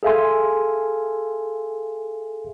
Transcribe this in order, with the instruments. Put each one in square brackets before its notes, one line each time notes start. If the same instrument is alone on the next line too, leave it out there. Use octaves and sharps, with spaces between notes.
[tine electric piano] G#4 A4 E5 F5 G#5 C6